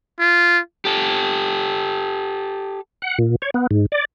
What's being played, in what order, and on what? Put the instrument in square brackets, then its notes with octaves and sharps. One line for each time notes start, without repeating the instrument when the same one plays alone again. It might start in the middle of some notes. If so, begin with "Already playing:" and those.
[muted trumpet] F4
[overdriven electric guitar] G4 A4
[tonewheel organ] F#5
A#2
C#5
B3
G#2
D5